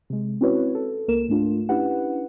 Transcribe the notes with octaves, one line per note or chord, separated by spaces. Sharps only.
C3 G#3
C4 C#4 E4 F#4 B4 C#5
A4
C#2 A#3 A#4 E7
G#2 A3 D4 F4
C#4 D4 E4 G4 B4 F#5